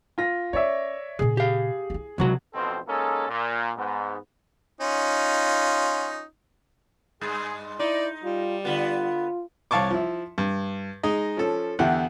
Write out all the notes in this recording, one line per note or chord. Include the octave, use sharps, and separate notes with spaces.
F4 A#6
C#4 C#5 D5 E5
A#2 C#3 G#4
G4 F5
D#4 E4
C#2 C3 F#3 B3 F#4
A1 F2 B2 C4 A4 C5
G#3 A#3 C#4 D#4 A4
A#2
G#2 B3
C#4 D#4 F4
G2 G#3 G#4
D#4 E4 D5
G3 F4
D3 B3 F4
C2 C#5 F5 A5 C#6 D6
F3 E4
G2
G#3 D#4 D#5
F3 C#4 A4
E2 D3 B3 E4 G4 F#5